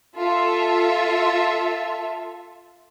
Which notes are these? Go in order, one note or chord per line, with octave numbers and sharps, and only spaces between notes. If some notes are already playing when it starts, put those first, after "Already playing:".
F4 A4 E5